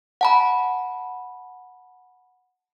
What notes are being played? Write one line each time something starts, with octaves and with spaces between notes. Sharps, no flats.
F#5 A5 B5